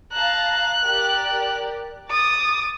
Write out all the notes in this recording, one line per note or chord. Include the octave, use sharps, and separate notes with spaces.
F5 A5 A#5 F#6
G4 A#4 D5
D6 D#6 A6